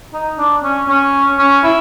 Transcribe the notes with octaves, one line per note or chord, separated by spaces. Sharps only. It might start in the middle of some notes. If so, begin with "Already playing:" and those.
D#4
D4
C#4
C#4
C#4
E4